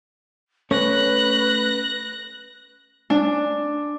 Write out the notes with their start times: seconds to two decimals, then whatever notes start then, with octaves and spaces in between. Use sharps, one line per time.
0.71 A3 C#4 B4 C#5 F#6 A#6
3.10 D4